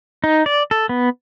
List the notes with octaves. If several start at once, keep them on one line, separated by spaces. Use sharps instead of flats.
D#4
D5
A4
B3